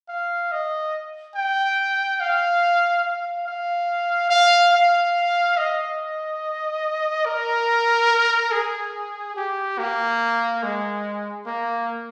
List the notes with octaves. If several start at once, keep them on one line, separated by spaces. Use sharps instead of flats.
F5
D#5
G5
F5
F5
F5
F5
F5
D#5
A#4
G#4
G4
A#3
G#3
A#3